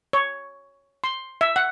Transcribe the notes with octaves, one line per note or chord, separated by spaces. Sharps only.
C#5
C6
E5
F#5